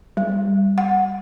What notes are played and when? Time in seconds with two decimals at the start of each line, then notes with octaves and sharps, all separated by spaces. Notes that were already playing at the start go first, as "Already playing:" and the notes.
0.17 G3
0.78 F#5